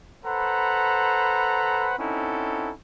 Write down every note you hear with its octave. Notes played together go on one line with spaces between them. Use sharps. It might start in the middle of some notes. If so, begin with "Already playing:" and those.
A4 B4 C5 F#5 A#5 B5
C4 C#4 D#4 E4 A4 F#5